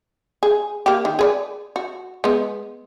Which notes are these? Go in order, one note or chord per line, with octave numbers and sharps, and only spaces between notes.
G#4
A#3 G4
D#3
G#4 B4 D5
F#4
G#3 B3